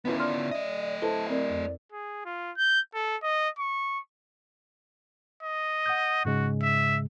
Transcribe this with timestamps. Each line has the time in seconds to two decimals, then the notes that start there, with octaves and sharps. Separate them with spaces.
0.05 D#3 B3 C#4 E4 F4 B4
0.19 D5 C6 F6
0.51 A3 D#5 E5
1.02 E4 A4 B4 C5 A5
1.29 C4 A#4 D5
1.50 F2
1.92 G#4
2.25 F4
2.57 G6
2.94 A4
3.23 D#5
3.59 C#6
5.43 D#5
5.86 F#5 D#6 G6
6.25 G#2 C#3 G#3 F#4
6.63 E5